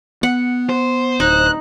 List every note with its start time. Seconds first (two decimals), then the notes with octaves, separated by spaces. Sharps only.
0.23 B3 F#5
0.69 C5
1.20 D1 D#4 F#6